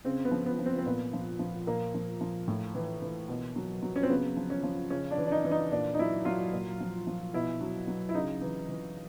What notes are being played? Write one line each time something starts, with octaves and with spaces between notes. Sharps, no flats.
C#3 C4
B3
F3
B3
F3
C4
C4
A#2 B3
F3
F3
A#2 A#3
F3
F3
A2
E3
E3
B2
F#3
F#3
C#4
C4
C#3 B3
F3
C#4
F3
C#3 C#4
D4
E3
D4
D#4
E3
D#4
A#2 D4
D#4
F#3 E4
F#3 F4
A#2
F3
F3
B2 E4
F#3
F#3
E4
C#3 D#4
E3
E3